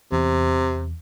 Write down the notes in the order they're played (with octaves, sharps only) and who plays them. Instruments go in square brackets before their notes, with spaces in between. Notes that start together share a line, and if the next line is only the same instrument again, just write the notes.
[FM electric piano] E2 [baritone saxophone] C3